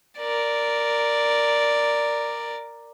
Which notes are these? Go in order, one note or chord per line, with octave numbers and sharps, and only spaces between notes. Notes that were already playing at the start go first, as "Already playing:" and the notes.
A#4 D5